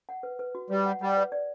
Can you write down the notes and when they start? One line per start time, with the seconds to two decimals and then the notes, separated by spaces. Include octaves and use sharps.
0.09 F#5
0.23 B4
0.39 B4
0.55 F#4
0.70 G3 B4
0.86 F#5
1.01 G3 F#5
1.17 B4
1.32 D5